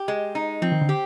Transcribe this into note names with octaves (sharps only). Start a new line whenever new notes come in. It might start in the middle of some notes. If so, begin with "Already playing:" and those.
Already playing: G4
G#3
D#4
F3 C4
D#3
D3
G4